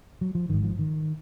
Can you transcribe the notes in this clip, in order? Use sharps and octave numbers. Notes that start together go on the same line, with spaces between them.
F#3
F3
G#1 G#2 D#3
F3
D#3